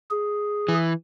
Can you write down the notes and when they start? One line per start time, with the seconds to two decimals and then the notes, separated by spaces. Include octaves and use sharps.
0.11 G#4
0.68 E3